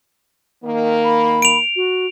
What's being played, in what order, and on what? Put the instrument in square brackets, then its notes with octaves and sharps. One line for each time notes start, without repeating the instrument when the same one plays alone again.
[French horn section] D#3 A#3
[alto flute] B5
[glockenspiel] D7 F7
[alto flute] F#4